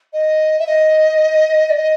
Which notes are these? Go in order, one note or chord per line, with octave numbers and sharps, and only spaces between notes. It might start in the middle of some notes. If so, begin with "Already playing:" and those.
D#5
E5
D#5
D5
D#5